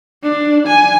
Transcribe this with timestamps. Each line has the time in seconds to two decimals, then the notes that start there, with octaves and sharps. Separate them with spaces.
0.23 D4
0.68 G#5